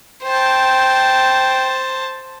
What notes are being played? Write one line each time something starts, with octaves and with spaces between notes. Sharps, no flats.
C5 G5 A5